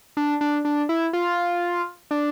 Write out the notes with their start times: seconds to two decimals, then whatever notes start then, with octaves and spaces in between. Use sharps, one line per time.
0.17 D4
0.41 D4
0.65 D4
0.89 E4
1.13 F4
2.11 D4